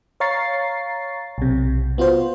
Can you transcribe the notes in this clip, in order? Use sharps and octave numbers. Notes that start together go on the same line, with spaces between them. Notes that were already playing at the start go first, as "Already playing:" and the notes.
C#5 F5 A#5 C#6 A6 C7
B1 C3
B3 F4 F#4 C5